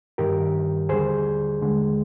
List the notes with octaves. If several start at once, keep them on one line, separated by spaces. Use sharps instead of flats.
G2 D#3 G3 G4 A#4
D#2 D3 G3 G#4 C5
D#2 D3 G#3